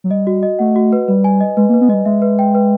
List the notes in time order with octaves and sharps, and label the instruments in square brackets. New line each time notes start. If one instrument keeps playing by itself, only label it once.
[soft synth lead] F#3
[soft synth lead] G3 [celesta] D#5
[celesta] F#4
D#5
[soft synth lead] A3 [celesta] F#5
[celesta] F#4
B4
[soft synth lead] G3 [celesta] B4
[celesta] G#5
D#5
[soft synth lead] G#3 [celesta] B4
[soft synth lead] A#3
[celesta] B4
[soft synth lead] B3
[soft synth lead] G3 G#3 [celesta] D#5
[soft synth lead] G#3 [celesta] E5
[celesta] B4
G5
B4